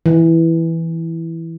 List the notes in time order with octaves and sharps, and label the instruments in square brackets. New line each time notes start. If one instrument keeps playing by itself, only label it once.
[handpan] E3